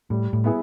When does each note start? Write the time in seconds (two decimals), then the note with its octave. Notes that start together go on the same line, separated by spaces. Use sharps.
0.10 A2 G3
0.33 A2
0.44 B3 E4 G#4